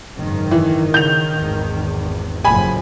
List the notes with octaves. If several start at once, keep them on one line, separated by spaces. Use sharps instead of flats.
F#1 G#2 D#3
E3
C#3 G6 F7
G#1 E2
F#1 A2 F3 G#5 B5